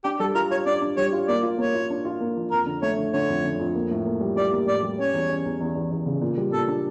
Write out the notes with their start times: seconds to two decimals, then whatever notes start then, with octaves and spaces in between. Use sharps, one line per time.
0.04 D4 G4
0.20 G3 A4
0.35 F4 A#4
0.50 F4 C#5
0.66 D4 D5
0.81 D4
0.97 G3 C#5
1.13 F4
1.28 A#3 D5
1.43 F4
1.58 A#3 C#5
1.75 F4
1.90 D4
2.05 F4
2.21 A#3
2.37 F3
2.51 F2 A#4
2.66 D3
2.82 A3 C#5
2.98 D3
3.13 D3 C#5
3.29 F2
3.44 D3
3.60 F2
3.75 A#3
3.91 A2
4.05 A#3
4.21 G3
4.36 G3 D5
4.52 A#3
4.67 A2 D5
4.83 G3
4.98 C#4 C#5
5.14 E2
5.29 C#4
5.45 E2
5.60 E2
5.75 E2
5.91 E2
6.06 C#3
6.21 A#2
6.37 G3
6.53 A#2 A4
6.68 D4